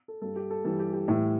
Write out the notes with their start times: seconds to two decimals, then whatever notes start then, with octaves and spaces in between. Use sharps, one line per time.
0.08 A4
0.22 G2 G3 A4
0.36 G4
0.50 A4
0.64 G2 E3 G3 A4
0.79 G4
0.93 G4
1.08 A2 E3 G3 E4